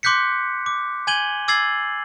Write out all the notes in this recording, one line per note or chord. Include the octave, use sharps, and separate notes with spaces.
C6 D6 F#6 G6 B6 C#7
D6
G#5 G6 G#6 D#7 F#7 G7
D6 E6 G#6 A6 C7 F#7